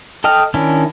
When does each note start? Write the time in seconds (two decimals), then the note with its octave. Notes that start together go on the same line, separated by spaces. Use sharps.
0.24 A4 D#5 G5 F6
0.54 D#3 C#4 D4 E4